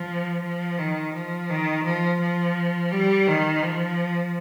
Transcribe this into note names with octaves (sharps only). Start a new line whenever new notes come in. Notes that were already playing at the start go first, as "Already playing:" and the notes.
Already playing: F3
F3
D#3
F3
D#3
F3
F3
G3
D#3
F3